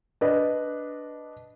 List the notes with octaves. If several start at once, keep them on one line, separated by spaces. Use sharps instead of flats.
D4 B4 D#5